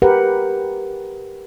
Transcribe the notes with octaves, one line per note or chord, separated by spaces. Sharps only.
G4 A#4 B4 F#5